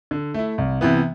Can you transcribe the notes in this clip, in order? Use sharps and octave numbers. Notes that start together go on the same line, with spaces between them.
D3
A3 E4
C2
C3 E3 B3